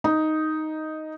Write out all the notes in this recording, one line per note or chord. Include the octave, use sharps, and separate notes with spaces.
D#4